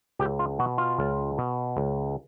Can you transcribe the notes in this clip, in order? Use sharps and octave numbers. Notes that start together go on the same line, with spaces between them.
C#2 G4
F4
B2 F#4
F4
C#2
B2
C#2